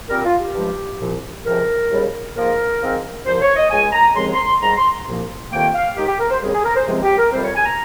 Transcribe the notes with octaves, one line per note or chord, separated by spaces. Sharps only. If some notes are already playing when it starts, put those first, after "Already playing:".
A#2 G3 C4 A#4
F4
G4
G2 F3 G#3
C2 A#2 F3
C#2 C3 F3 A#4
D#2 C#3 G3
G#2 F3 A#3 A#4
G#2 F3 C4
C2 A#2 F3 A#3 C5
C#5
D#5
C#2 C#3 G#3 G#5
A#5
D#2 C#3 F3 G#3 C4 C6
C6
G#2 D#3 G3 A#5
C6
C2 A#2 F3 A#3
F2 C3 D#3 A#3 G5
F5
D#2 D#3 G#3 G4
G4
A#4
C5
D#2 C#3 G3 C4 G#4
G#4
A#4
C5
C#2 C3 F3 G#3 C4 G#4
G4
A#4
F2 C3 G3 C4 C5
C#5
G#5
A#5